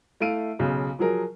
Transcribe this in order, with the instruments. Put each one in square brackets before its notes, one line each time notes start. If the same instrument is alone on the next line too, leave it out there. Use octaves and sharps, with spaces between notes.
[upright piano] A3 E4 F5 D7 D#7
B1 C#3
F3 F#3 G#4 A#4